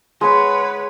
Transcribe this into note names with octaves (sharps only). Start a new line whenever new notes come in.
G#3 B4 C#5 F#5 B5